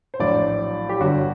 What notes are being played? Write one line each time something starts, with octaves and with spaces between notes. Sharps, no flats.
C5
A#1 A2 F#3 D5
G4
G1 G2 D3 F#3 F#4